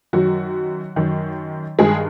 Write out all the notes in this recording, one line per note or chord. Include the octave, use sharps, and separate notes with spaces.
F#2 D#3 F#3 F#4
F#2 D#3
G2 D#3 G#3 G#4